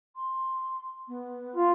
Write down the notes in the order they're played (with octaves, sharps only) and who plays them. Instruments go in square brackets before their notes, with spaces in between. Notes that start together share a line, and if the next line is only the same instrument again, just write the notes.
[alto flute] C6
B3
[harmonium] F4